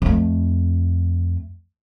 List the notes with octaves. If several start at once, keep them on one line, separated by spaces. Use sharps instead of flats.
F2 A3